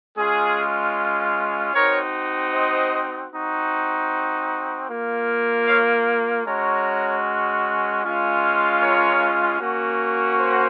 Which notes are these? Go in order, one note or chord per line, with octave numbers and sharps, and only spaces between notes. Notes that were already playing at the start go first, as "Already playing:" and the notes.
G#3 C#4 F4 G#4
C4 D#4 F#4 A#4 C#5
C5 D#5
C4 D#4 F#4
A#3 F4
C#5 F5
G#3 C#4 F#4 A#4 C#5
G#3 C#4 F4
A#4 C#5
A#3 C#4 F#4
C5